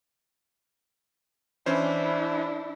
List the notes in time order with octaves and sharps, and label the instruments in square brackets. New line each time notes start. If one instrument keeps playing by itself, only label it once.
[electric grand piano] E3 C#4 C5 [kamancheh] D4 E4